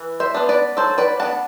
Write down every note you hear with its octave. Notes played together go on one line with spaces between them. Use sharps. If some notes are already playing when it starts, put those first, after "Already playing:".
Already playing: E3
C5 E5
B3 D4
B4 D5
F#3 A4 C5
B4 D5
B3 D4 F#5 A5